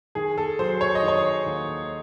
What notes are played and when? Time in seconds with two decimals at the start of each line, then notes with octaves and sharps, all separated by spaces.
0.15 D#3 G#4
0.38 A4
0.59 F#3 C5
0.81 C#5
0.95 D#5
1.03 D#3
1.08 C#5
1.46 D#2